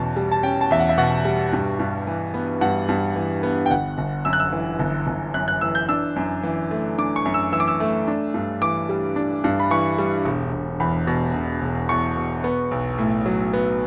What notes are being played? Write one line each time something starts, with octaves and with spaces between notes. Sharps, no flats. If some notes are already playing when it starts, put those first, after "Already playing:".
Already playing: E2 B2 C#4 A5
G3
A5
C#4 G5
A5
E2 E5
F#5
E5
B2 F#5
G3
G2
G2
E3
B3
G2 F#5
G2
E3
B3
G5
G1 F#5
G1
F#2 E6
F#6
E6
E3
G1
G1
F#2 F#6
F#6
E3 E6
G6
D4 E6
F#2
E3
A3
D4 D6
C#6
F#2
E6
E3 E6
D6
E6
A3
D4
G2
E3 D6
G3
D4
G2
B5
E3 C#6
G3
E1
E1
E2 B5
B2
E1
E1
E2 C#6
B2
B3
B1
A2
F#3
B3